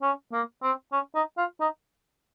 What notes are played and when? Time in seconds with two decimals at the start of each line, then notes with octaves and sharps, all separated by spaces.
0.02 C#4
0.33 A#3
0.63 C4
0.93 C#4
1.15 D#4
1.38 F4
1.60 D#4